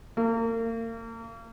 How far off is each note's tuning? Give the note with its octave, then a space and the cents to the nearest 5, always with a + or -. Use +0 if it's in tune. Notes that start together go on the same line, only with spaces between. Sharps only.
A#3 -35